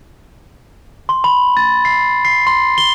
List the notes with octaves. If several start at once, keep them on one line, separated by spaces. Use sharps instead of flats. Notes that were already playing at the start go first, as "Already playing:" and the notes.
C6
B5
A6
C7
C7
C6
G7